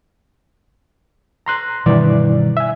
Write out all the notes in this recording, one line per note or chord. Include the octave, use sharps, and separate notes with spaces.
A#5 C6 F#6
G2 B2 D#3 E3 G3 D5
E5 G#5